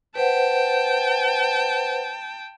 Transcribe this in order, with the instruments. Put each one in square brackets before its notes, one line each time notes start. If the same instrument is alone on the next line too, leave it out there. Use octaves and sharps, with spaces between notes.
[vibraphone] B4 C5 F#5 [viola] G5 A5